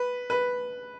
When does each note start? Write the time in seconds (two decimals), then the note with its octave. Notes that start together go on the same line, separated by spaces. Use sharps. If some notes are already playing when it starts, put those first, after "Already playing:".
Already playing: B4
0.30 B4